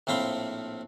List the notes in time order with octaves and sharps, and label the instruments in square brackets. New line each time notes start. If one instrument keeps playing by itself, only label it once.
[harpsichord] A#1 A2 C4 F5 B5 C6